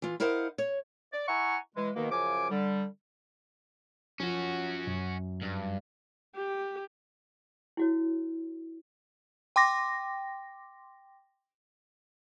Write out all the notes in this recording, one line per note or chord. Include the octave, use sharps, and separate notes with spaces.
E3 F4
E4 A#4 C5 D#5 F5 F#5
C#5
D5
E4 E5 F#5 G#5 A#5 C#6
E3 G#3
B2 D#3 A#3
F#2 C#3 F3 G#5 D6
D3 G3
F3 C#4 F#4
F#2
G2
G4
E4 F#4 C#5
G5 C6 D6 A#6